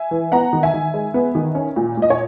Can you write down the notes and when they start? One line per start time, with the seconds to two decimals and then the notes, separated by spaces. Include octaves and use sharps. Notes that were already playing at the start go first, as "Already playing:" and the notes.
Already playing: E5 G#5
0.11 E3
0.32 B3 F#5 A#5
0.53 D#3
0.63 E5 G#5
0.73 D#3
0.94 G#3
1.14 B3
1.35 D#3
1.55 C#4
1.76 A#2
1.97 A#2
2.02 D#5
2.10 C#5